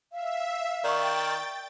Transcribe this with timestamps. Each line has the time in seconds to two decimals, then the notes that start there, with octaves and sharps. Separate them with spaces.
0.12 E5 F5
0.84 D#3 D5 G5 C#6 A6